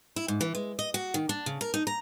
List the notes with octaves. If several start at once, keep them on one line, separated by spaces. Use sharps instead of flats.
E4
G#2
E3
G#3
D#5
F#4
D#3
D4
C#3
A#4
D#4
A#5